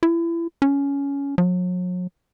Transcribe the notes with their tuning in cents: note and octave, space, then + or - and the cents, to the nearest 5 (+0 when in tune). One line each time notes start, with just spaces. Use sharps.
E4 +30
C#4 +15
F#3 -40